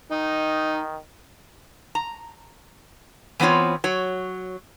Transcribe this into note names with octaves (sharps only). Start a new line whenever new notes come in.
D#3 D#4
A#5
E3 B3 C4 F4 C#5
F#3 C#5